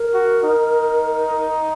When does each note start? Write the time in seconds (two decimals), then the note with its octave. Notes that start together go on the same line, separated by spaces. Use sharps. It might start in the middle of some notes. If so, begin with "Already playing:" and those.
Already playing: A#4
0.14 F#4
0.43 D#4